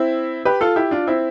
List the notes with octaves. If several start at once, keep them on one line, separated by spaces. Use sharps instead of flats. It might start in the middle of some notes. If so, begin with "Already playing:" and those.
Already playing: C4 E4
G4 B4
F4 A4
E4 G4
D4 F4
C4 E4